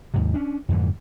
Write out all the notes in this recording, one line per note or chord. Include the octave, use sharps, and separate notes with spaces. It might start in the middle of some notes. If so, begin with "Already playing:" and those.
D#2 G#2 C3
C#4 D4
F2 G#2 D3 E3